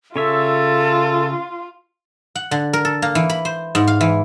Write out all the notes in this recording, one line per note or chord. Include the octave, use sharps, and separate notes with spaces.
C#3 F4 A4 C#5 E5
F#5
D3
A#4
A4
A#3
E3
B5
C5
G#2
F5
E3